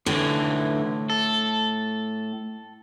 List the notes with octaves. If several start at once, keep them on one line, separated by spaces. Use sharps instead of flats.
A2 D3 E3
A4